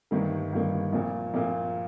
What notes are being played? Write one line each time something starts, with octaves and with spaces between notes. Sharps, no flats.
G1 G2 D#3 A#3
G1 G2 D#3 A#3
A#1 A#2 A#3
A#1 A#2 A#3